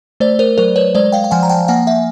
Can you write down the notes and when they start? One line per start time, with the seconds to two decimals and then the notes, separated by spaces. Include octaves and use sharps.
0.20 A3 C5 D5
0.39 A#4 C5
0.58 F#3 A#4 C5
0.76 B4 C#5
0.95 G#3 C5 D5
1.12 F5 G5
1.24 G5
1.31 F3 F#5 G#5
1.43 A#5
1.49 G5 A5
1.68 A#3 F#5 G#5
1.87 E5 F#5